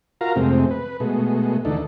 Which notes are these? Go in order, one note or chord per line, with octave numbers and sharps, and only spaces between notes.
F4 F#4 A#4 F5 A#5
F2 C3 G#3 A3 C4
B4
B2 G#3 A3
D2 E3 D4 D#4 A4